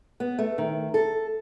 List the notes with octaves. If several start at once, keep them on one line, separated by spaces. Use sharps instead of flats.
B3
A3
D#3
A4